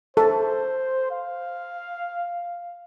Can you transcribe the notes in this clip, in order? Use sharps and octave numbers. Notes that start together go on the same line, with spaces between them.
A4 C5
F5